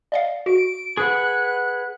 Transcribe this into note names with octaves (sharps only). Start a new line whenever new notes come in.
D5 D#5 F5
F#4 D7
G#4 B4 F#5 F#6